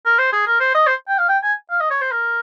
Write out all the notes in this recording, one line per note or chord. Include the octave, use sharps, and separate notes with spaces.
A#4
C5
G#4
A#4
C5
D#5
C5
G5
F5
G5
G#5
F5
D#5
C#5
C5
A#4